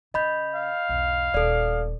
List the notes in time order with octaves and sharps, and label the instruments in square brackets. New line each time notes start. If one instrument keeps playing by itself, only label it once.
[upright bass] C#3 [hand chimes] D#5 B5 G6
[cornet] F5
[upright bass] B1 E2
[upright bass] D#1 A3 [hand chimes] A4 D5